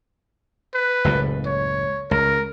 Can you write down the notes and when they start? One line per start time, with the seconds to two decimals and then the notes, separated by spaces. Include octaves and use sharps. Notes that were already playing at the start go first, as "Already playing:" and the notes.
0.74 B4
1.04 F#1 C#2 A2
1.46 C#5
2.11 C#2 A#4